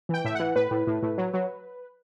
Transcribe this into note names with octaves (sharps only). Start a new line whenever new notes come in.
E3 G5
A2 E5
E3 F#5
A2 B4
A2
A2
A2
F#3
F#3